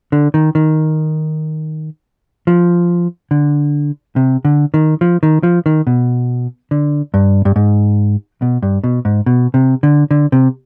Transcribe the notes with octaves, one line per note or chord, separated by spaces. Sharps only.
D3
D#3
D#3
F3
D3
C3
D3
D#3
F3
D#3
F3
D#3
B2
D3
G2
G2
G#2
B2
G2
B2
G#2
B2
C3
D3
D3
C3